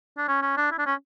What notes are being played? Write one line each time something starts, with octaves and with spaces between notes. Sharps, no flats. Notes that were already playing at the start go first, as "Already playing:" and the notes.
D4
C#4
C#4
D4
E4
D4
C#4